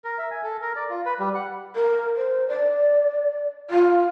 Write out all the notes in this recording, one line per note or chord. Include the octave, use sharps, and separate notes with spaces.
A#4
E5
G#5
A4
A#4
D5
F4
B4
G3
F#5
A#4
C5
D5
F4